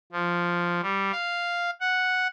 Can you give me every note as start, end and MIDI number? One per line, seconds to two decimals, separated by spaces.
0.12 0.81 53
0.82 1.11 55
1.12 1.70 77
1.81 2.27 78